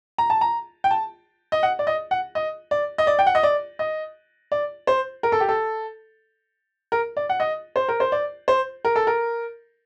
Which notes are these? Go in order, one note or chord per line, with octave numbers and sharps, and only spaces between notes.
A#5
A5
A#5
G5
A5
D#5
F#5
D5
D#5
F#5
D#5
D5
D#5
D5
G5
F#5
D#5
D5
D#5
D5
C5
A#4
A4
G4
A4
A#4
D5
F#5
D#5
C5
A#4
C5
D5
C5
A#4
A4
A#4